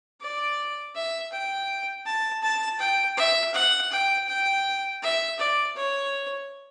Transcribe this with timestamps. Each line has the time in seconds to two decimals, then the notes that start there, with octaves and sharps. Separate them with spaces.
0.21 D5
0.95 E5
1.32 G5
2.06 A5
2.43 A5
2.80 G5
3.17 E5
3.54 F#5
3.92 G5
4.29 G5
5.03 E5
5.39 D5
5.76 C#5